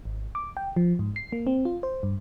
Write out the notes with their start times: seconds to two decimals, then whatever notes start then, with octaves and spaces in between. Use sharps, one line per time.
0.05 G#1
0.35 D6
0.57 G5
0.76 F3
0.99 G#2
1.16 C7
1.32 A#3
1.47 C4
1.65 F4
1.83 C5
2.03 G2